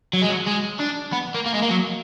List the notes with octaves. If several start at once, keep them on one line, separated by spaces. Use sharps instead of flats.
F#3
G#3
F#3
G#3
D4
B3
A#3
A#3
G#3
A#3
F#3